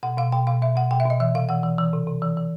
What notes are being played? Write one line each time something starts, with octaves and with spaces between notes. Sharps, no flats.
B2 F#5
B2 F5
B2 G5
B2 F5
B2 E5
B2 F#5
B2 G5
E5
B2 D#5
E3 E5
C3 F5
E3 F#5
E3
E3
C3
C3
E3
E3